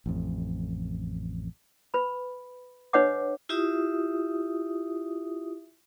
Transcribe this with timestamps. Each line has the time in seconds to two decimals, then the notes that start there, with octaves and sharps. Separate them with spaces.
0.06 A1 F2
1.94 B4 B5
2.93 D4 B4 C#5 D#5 F#5 D6
3.49 E4 F4 G4 E5 D#6